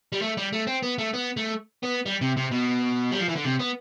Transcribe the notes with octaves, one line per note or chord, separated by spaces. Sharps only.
G3
A3
G3
A3
C4
B3
A3
B3
A3
B3
G3
C3
C3
B2
G3
F3
E3
D3
C3
B3